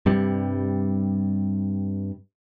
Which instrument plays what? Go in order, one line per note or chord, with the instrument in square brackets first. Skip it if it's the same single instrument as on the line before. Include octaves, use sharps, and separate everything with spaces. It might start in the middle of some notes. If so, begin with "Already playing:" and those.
[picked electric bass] G2 C3 G3